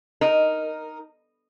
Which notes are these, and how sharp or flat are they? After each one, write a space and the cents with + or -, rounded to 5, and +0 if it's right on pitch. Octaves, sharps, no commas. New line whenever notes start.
D#4 +0 A#4 +0